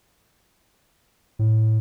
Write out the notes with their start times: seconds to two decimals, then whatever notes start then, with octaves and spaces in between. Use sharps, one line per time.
1.39 A2